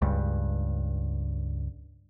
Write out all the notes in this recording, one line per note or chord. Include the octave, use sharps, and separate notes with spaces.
C#2 G2